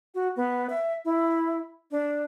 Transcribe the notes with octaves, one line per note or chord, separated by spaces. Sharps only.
F#4
B3
E5
E4
D4